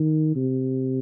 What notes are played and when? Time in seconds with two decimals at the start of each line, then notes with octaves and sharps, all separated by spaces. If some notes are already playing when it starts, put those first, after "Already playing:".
Already playing: D#3
0.36 C3